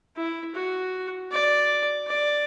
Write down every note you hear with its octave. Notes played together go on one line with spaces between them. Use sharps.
E4
F#4
D5
D5